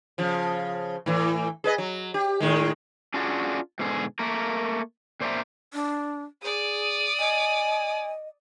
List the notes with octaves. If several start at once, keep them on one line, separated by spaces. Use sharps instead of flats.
C#3 F3
A2 E3
G#4 B4 D#5
F#3
G4
A2 D#3 G#3
C#4 D4 F4 F#4 G#4 D5
G#2 B2 D3 G#4
A3 A#3 A#4
A#2 C5 D5 E5 A#5
D4
G#4 D5 D#6
D#5 G#5